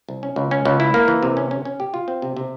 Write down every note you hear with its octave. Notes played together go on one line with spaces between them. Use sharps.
C2
C#4
C#2
C#4
C#2
E4
A#3
E3
C3
C#4
C#4
C#4
G4
F4
C4
C3
C3